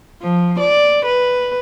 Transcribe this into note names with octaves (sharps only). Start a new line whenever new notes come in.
F3
D5
B4